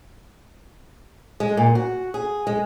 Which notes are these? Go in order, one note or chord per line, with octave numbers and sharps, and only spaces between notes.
G#3
A#2
F#4
G#4
G#3